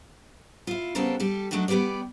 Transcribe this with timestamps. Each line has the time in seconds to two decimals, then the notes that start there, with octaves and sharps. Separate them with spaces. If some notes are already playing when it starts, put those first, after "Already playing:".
0.67 E4 F4
0.95 C#3 G3 B3 C4 A4 A#4
1.20 G3 G4 A4
1.51 F#3 A3 D4 D#4 F#4
1.68 G3 B3 G4 B4 D5